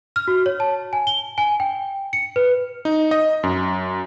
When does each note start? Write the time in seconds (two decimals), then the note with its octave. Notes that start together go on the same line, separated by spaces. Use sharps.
0.16 F6
0.28 F#4
0.46 C#5
0.60 A5
0.93 G#5
1.07 G7
1.38 G#5
1.60 G5
2.13 C#7
2.36 B4
2.85 D#4
3.11 D#5
3.43 F#2